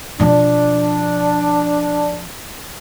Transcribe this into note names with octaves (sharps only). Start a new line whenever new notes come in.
B2 F3 D4